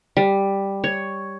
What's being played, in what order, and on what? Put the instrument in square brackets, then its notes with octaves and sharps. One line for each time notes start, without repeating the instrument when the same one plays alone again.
[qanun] G3
C#5